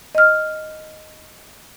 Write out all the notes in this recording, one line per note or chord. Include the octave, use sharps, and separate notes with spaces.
D#5 F6